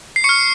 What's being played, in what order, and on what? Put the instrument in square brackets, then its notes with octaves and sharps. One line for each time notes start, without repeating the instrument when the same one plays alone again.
[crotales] C7
C#6 F6 C#7